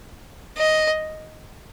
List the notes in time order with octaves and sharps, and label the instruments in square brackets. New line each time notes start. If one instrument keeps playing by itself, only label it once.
[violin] D#5